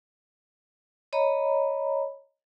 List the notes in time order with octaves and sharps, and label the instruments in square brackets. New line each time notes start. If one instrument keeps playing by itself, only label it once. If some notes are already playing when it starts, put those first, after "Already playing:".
[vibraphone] C#5 D#5 A#5 B5